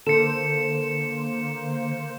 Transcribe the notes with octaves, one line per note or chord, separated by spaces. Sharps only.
D3 A#3 A4 C5 C#7 E7